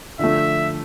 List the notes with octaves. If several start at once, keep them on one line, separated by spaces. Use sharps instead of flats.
D3 F3 A3 E5